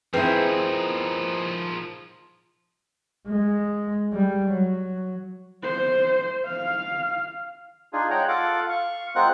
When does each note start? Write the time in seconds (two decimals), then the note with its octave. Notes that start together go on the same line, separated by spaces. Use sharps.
0.14 F3 C4 D#4 E4 G#4 A#4 B4
3.27 G#3
4.13 G3
4.52 F#3
5.63 C5
6.46 F5
7.93 D4 D#4 F4 G#4
8.10 G#3 C#5 F#5 G5 A#5
8.28 F4 A4 F5 F#5 D6
8.69 F5 C#6
9.15 G#3 C4 F4 A#4 F#5 F#6